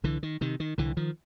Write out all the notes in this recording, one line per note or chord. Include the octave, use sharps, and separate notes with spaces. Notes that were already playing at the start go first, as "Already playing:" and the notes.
C2 D3 E3
D#3
C3 D#3
D#3
C2 D3 E3
D#3 F3